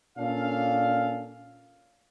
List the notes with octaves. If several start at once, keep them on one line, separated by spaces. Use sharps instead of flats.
A#2 C#4 D4 A4 F5